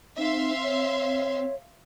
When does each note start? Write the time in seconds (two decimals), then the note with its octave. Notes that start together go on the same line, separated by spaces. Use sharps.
0.18 C4 D#4 E5 F5 C6
0.63 C#5